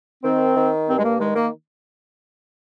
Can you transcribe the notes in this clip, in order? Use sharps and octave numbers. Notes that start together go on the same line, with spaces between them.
D#3 C4
D#3
G2 C4
G#3
A#3
D#3 G#3
A#3